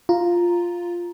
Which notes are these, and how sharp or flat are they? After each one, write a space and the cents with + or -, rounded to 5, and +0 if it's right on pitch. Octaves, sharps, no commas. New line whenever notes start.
F4 +0 A#5 +0